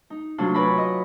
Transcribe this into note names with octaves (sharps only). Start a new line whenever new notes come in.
D#4
C3 F#3 A3 D4 F4
B4 C#5 D5 G#5 A#5 B5
D#5